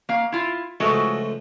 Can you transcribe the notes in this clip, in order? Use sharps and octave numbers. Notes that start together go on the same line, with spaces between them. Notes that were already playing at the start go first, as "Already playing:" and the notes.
A#3 F5
E4 F4
C#2 F3 G#3 A3 F#4 A4